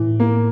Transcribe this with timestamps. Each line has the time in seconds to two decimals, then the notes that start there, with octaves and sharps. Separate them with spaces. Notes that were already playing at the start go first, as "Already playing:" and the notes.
Already playing: A2 E3
0.20 A#3